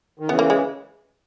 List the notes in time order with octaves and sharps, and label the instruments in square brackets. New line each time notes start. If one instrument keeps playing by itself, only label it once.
[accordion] D#3
[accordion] C#3 E3 [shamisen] B3
[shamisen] A#3
G#3